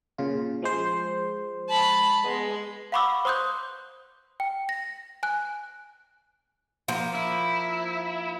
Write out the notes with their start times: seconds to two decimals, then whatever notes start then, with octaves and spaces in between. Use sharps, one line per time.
0.18 A#2 C#3 F4
0.62 F3 G#3 C5
1.69 A5 B5
2.24 G#3 B3
2.92 F5 F#5 B5 C#6 D6 E6
3.25 C5 C6 D#6 F#6 G6
4.40 G5
4.69 A#6
5.23 G#5 F#6
6.88 F3 A#3
7.15 E4